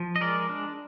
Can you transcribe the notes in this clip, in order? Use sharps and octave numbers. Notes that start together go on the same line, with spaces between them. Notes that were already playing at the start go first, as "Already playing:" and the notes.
Already playing: F3
D#5
G#3 A#4 D5
D4